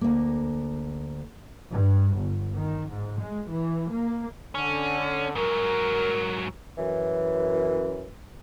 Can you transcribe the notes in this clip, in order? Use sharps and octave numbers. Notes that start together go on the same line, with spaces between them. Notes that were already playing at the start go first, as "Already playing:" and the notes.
D2 A#3
G2
G1
D#3
G#2
G#3
E3
A#3
D3 C#4
G#2 F#3 A#4
F#2 E3